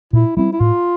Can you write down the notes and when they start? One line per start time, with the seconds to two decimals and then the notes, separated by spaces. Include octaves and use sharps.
0.13 A#2 E4
0.37 G3 C4 E4
0.53 E4
0.60 A2 F4